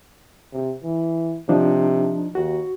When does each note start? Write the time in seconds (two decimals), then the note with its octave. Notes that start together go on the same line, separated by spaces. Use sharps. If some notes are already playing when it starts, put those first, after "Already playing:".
0.53 C3
0.84 E3
1.49 C3 F3 D4 D#4
2.35 D#2 F#4